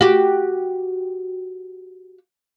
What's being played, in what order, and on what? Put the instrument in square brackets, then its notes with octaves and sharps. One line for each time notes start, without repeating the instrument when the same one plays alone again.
[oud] F#4 G4